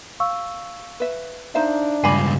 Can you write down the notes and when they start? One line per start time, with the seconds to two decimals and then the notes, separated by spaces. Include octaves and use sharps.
0.20 F5 C#6 E6
1.00 B4 E5
1.55 D4 D#4 C5 E5 F5 A#5
2.04 C#2 G2 G#5 B5 D6 C7